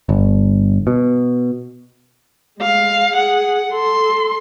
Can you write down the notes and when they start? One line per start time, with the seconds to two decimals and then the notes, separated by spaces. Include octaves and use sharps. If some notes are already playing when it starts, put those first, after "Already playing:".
0.09 G1
0.87 B2
2.60 G#3 F5
3.13 G#4 F#5
3.72 A4 C6